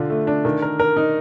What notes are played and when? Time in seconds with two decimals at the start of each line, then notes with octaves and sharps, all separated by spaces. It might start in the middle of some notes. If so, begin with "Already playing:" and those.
Already playing: D3 D4 F4
0.10 A3
0.27 D4
0.45 D#3
0.62 A#4
0.79 A#4
0.97 D#4